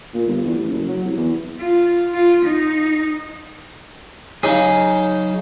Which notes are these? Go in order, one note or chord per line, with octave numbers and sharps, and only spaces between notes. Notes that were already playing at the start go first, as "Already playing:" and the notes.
A#2
G1
E2
A1
F#1
F#3
C2
E2
F4
F4
D#4
C#3 F#3 C#4 D#4 G#4